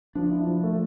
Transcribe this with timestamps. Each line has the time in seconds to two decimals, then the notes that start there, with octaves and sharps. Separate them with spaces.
0.15 F3 D4
0.32 E4
0.47 F3
0.64 A3